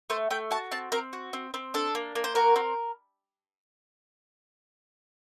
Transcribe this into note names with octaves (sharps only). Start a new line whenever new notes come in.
A3 C5
A3 G5
F#4 A5
C4 A5
C4 A#4
F#4
C4
C4
D4 A4
A#3
A#3
C5
F#4 A#4
C4